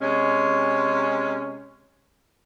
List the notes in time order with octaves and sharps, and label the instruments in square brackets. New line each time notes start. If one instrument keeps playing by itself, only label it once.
[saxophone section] C3 G#3 C#4